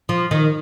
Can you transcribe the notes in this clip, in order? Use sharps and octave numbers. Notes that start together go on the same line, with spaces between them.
F3
D#3